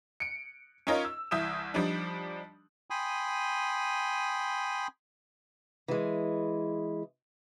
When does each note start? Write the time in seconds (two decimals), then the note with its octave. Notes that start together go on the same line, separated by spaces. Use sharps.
0.20 C#7 D7
0.87 C#4 D#4 F4 A#4 C#5 D#5
1.05 E6
1.31 C2 E3 E5 D#6 G6 E7
1.74 F3 G3 D4 D#4
2.90 G5 G#5 B5 C6 D#6
5.88 E3 G#3